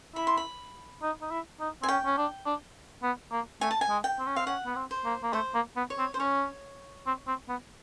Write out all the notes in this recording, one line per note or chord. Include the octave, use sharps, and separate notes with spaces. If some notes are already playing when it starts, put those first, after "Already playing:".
E4 B5
C6
B5
D#4
D#4
E4
D#4
C4 G#5
C#4 G5
C#4
D4
D4
B3
A#3
A3 G#5
A5
G#5
G#3
G5
C4
C#4
C4 F5
C#4 F#5
B3
C4
C5
A#3
A#3
A3 C5
A#3
B3
C#5
C4
C5
C#4 C#5
C4
C4
B3